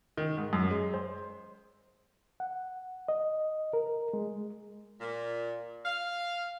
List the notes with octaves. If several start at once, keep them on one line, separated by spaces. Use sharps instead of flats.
D#3
G#2
F#2
G#3
C5
F#5
D#5
A#4
G#3
A#2
F5